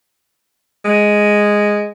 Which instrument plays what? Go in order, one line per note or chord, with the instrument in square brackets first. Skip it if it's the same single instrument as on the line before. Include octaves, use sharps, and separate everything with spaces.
[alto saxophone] G#3